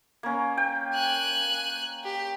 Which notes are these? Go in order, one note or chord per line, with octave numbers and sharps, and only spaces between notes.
A#3 C#4
G5
G#5 F#6
G4